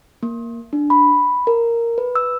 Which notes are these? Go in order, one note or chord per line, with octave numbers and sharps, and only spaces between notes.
A#3
D4
B5
A#4
B4
E6